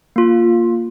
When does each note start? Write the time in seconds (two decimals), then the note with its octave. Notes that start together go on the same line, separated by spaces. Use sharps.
0.16 A#3 F4